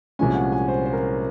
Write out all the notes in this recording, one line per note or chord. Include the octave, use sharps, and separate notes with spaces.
C2 A#2 F3 G#3 C#4 G#5
F#5
G#5
C5
C5
A#4